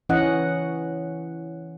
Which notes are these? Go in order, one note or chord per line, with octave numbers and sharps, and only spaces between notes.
E3 C#4 D#5 F#5